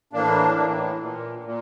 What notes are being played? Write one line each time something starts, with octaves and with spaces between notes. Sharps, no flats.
A2 E3 A#3 D4
A2 E3
A#2
A#2